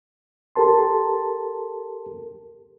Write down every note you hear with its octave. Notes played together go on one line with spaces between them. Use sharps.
G4 A4 A#4 A5 C6